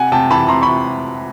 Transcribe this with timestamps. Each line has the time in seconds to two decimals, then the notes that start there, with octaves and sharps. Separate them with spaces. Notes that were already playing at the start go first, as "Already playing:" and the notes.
Already playing: C3 F#5 G#5
0.12 C3 G5 A5
0.30 E3 A5 B5
0.48 C3 A#5 C6
0.62 C3 B5 C#6